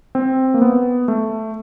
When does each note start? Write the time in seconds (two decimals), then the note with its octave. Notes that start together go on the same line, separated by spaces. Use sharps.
0.15 C4
0.54 A#3
0.62 B3
1.08 A3